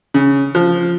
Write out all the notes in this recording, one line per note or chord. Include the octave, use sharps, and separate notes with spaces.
C#3
F3